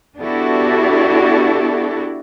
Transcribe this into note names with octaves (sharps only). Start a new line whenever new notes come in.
B3 D4 E4 F#4 G4 A4